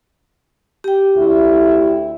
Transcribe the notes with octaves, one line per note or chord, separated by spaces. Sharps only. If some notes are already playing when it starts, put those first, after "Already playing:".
G4 G5
D2 E4